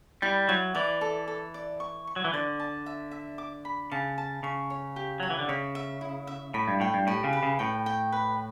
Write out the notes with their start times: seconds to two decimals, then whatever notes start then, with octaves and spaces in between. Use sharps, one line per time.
0.22 G3 E4
0.49 F#3 E4
0.75 E3 D5
1.01 A4
1.28 A4
1.54 D5
1.80 C#6
2.07 C#6
2.16 F#3
2.25 E3
2.33 D3 D5
2.60 A5
2.86 E5
3.11 E5
3.38 D6
3.65 B5
3.91 C#3 A5
4.18 A5
4.43 C#3 C#6
4.70 C#5
4.96 G4
5.20 F#3 C#5
5.30 E3
5.39 D3
5.49 C#3 E5
5.75 E5
6.01 E4
6.27 E5
6.54 A2 B5
6.68 G2
6.80 A2 G5
6.94 G2
7.07 A2 G4
7.24 C#3
7.33 B4
7.43 C#3
7.59 A2 G5
7.86 G5
8.12 B4